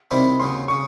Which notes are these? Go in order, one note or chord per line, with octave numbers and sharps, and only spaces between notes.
C3 D#3 G3 C4 E4 B5
D#2 C#3 F#3 C6
C#3 C#6